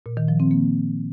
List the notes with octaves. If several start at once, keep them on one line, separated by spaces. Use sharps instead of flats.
A#2
D#3
F3
C4
A#3